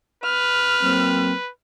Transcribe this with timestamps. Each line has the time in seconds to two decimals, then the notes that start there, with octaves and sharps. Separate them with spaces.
0.24 B4 F6
0.83 F#3 A#3 C4